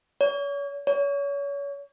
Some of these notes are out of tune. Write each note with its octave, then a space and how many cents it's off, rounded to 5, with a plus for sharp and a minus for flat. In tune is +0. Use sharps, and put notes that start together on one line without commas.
C#5 +35
C#5 +30